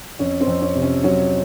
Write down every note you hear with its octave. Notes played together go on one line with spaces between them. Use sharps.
F2 C#4
C4
F2
C#4
C3
C#4
F#3 C#4